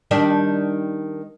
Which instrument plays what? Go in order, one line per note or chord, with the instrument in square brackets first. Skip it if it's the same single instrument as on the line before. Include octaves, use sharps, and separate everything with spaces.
[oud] D#3 G3 D4